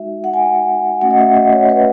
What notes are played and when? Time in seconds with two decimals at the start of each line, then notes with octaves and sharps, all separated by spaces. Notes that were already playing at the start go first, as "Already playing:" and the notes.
Already playing: G#3 D#4 F#4 E5
0.24 F#5
0.33 G#5
1.01 A3 C#4 F#4 F#5
1.11 D#5
1.18 E5
1.36 D#5
1.52 C#5
1.69 B4